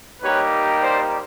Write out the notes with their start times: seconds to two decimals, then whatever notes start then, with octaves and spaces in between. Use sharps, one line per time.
0.23 G3 A#3 D#4 G4 B4 C#5
0.81 C5 D5